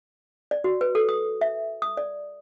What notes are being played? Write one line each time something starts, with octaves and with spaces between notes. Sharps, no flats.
D5
F#4
B4
A4
D#6
E5
D#6
D5